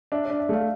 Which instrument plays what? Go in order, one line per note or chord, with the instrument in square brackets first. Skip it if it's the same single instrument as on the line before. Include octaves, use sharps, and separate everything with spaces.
[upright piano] D4 [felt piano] E5
[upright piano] D4 [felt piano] D5
[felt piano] E5
[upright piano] A3 [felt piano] F5